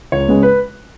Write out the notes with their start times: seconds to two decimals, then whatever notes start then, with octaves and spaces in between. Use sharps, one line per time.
0.12 C#2 C#5
0.28 C#3 G#3 B3
0.43 B4